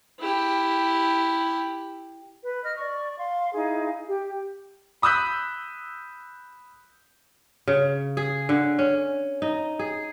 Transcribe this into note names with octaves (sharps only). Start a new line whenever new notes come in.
E4 G4
B4
D#5 F6
D5 C#6
F5 C6
D#4 E4 G#4 F5
G4
B5 D#6 E6 F#6 G6 B6
C#3
G#4
D3
C#4
D#4
G#4